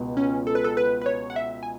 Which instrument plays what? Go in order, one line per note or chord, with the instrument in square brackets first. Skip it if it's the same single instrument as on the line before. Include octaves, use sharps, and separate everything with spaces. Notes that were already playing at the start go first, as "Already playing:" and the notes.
Already playing: [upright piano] C#2 B2 G#3
[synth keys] C#4
A4
B4
A4
B4
B4
C#5
F#5
E5
G#5